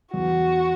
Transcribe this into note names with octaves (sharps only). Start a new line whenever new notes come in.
E2 F#4